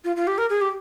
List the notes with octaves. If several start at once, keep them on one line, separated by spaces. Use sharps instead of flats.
F4
F4
G4
A#4
G#4
G4